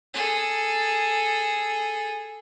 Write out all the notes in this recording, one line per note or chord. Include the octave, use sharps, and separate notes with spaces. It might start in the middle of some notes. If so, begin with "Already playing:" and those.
G#4 A4